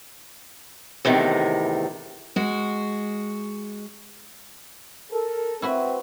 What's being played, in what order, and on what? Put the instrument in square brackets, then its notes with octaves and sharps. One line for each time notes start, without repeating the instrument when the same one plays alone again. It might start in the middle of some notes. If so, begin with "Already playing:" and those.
[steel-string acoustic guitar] E2 A2 C3 D#3
G#3 F#4
[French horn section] A4 A#4
[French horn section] C4 [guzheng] E4 F#4 B4